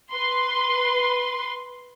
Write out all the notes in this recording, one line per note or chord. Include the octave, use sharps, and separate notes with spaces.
B4 C6